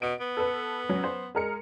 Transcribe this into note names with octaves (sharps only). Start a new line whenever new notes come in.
B2 D7
B3
A4 B4
F#3 C#4
C5
G#3 A#4 C#7